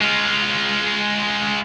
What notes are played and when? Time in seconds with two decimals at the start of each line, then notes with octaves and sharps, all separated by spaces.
0.01 G#3 F4